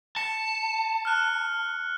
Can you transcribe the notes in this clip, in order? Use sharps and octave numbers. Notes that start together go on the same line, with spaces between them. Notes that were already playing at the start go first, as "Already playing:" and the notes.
A5 C#7
F6 F#6